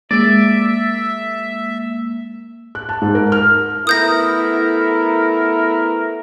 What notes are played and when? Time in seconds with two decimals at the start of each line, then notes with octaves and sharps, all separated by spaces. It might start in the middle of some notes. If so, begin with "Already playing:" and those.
0.11 G#3 A#3 D5 E5
2.75 F#6
2.89 A5
3.02 G#2
3.15 A#4
3.32 F6
3.87 A3 B3 E4 A#4 D#6 G6 A#6